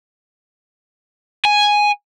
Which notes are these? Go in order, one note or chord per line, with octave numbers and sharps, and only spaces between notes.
G#5